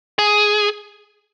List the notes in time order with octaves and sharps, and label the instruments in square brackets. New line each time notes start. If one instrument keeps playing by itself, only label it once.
[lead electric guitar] G#4